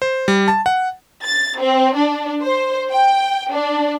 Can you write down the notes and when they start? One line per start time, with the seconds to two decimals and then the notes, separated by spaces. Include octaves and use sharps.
0.02 C5
0.28 G3
0.48 A5
0.66 F#5
1.25 A6
1.60 C4
1.95 D4
2.43 C5
2.91 G5
3.53 D4